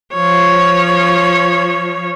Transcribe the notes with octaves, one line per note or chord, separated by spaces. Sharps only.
F3 C#5